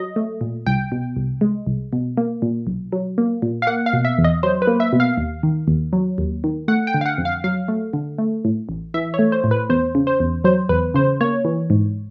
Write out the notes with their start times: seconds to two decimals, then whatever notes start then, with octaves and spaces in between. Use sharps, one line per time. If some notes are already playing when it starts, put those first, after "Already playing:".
Already playing: F#3 D#5
0.16 A3
0.41 A#2
0.66 C2 G5
0.92 B2
1.16 C2
1.41 G#3
1.67 C2
1.93 B2
2.17 A#3
2.42 A#2
2.67 B1
2.92 F#3
3.18 A#3
3.42 A#2
3.62 F5
3.67 A#3 F#5
3.86 F5
3.93 B2
4.05 E5
4.18 E2
4.24 D#5
4.43 F#3 C5
4.62 B4
4.67 A#3
4.80 E5
4.93 B2
5.00 F5
5.17 D#2
5.43 D#3
5.68 D#2
5.93 F#3
6.18 D#2
6.44 D#3
6.68 A3 F#5
6.87 G5
6.94 D3
7.01 F5
7.06 F#5
7.18 F2
7.25 F5
7.44 F#3 F5
7.68 A3
7.93 D3
8.18 A3
8.45 A2
8.69 A1
8.94 E3 E5
9.14 C#5
9.19 A3
9.32 C5
9.44 A2
9.51 B4
9.70 E2 C5
9.95 C#3
10.07 C5
10.20 E2
10.44 F#3 C5
10.69 E2 B4
10.94 C#3 C5
11.21 A#3 C#5
11.45 E3
11.70 G#2